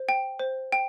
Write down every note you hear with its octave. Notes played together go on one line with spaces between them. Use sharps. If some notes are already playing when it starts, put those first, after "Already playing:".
Already playing: C5
G5
C5
G5